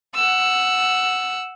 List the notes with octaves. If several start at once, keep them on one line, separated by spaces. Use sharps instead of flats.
F#5 E6